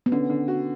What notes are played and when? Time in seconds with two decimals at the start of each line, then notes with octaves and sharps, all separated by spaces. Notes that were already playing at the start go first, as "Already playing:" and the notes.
0.06 B3
0.12 D3 C#4
0.30 D3
0.48 F#4